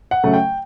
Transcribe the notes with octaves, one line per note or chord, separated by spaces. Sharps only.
F#5
C#3 F#3 A3
G5